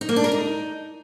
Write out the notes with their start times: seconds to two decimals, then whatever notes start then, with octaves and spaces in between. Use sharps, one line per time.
0.01 D#4
0.09 A#3
0.16 D4
0.24 A#4
0.32 D#4